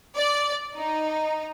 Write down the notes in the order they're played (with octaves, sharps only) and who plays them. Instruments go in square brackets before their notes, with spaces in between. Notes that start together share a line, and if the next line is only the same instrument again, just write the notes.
[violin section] D5
D#4